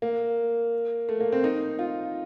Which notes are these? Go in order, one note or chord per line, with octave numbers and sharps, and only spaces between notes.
A#3
A3
A#3
C4
D#4
F4